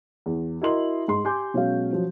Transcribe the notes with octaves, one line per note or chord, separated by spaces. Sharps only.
E2
E4 F#4 A#4 D#5 C6 F#7
G#2 C6
G4 G#5 C6 D6 G6
B2 F#3 G#3 C#4 F5
F3 F#3